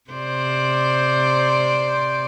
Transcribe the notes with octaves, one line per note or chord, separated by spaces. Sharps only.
C3 C5 D5